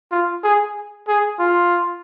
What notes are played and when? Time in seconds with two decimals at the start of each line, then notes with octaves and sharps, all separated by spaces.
0.11 F4
0.43 G#4
1.08 G#4
1.39 F4